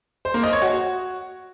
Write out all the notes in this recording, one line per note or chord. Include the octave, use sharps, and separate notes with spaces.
C5
A#3
D#5
C#5
F#4